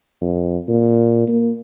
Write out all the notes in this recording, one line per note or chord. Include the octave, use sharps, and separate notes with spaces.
F2
A#2
A#3